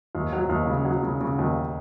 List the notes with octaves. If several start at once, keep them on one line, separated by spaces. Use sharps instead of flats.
D#2
F#3
D#2
C#3
F#3
C#3
C#3
D#2